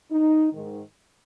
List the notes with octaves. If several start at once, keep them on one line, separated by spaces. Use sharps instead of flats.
D#4
G#2 D#3